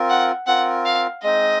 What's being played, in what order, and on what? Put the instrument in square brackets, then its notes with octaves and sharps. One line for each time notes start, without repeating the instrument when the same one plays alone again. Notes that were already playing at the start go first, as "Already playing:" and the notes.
Already playing: [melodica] C4 F4 A#4
[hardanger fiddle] F#5
[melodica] C4 F4 A#4 [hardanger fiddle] F#5
[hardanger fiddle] F5
[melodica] G#3 C4 D#4 [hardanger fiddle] D#5